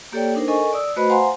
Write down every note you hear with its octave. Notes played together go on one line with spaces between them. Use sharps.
A#3 G4 A4 C#5 D5 G5
D4 D#4 A#4 C5
A4 A#4 D#5 G#5 C#6
D5 D#6 E6
A3 F#4 B4 C5 D#5 B5
C5 F5 F#5 G#5 A#5 C6